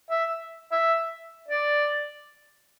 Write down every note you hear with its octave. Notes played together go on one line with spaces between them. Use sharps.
E5
E5
D5